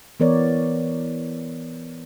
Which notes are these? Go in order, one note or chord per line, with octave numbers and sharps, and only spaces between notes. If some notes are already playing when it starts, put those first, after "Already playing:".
E3 B3 A#4 C#5 D5